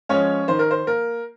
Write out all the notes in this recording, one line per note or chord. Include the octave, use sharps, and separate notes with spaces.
F3 G#3 C#4 C#5
D#3 C5
A#4
C5
A#3 A#4